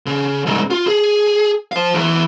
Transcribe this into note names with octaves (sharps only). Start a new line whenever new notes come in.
C#3
C2 G#2
F4
G#4
C5 F5
E2 E3